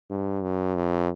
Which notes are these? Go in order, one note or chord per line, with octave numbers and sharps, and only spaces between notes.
G2
F#2
F2